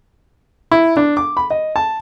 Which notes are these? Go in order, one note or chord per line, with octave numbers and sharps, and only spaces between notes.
E4
D4
D6
B5
D#5
A5